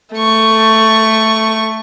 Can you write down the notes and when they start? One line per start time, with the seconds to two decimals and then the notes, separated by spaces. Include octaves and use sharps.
0.15 A3 C#6